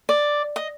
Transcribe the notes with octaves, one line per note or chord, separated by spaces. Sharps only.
D5
D#5